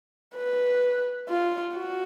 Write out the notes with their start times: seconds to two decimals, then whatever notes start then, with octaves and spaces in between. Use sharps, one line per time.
0.36 B4
1.29 F4
1.75 F#4